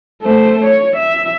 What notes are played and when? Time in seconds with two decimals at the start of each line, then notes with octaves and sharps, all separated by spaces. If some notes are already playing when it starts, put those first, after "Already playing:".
0.22 A3 C5
0.65 C#5
0.97 E5